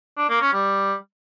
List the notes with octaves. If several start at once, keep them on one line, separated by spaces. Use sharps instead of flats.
D4
A#3
C#4
G3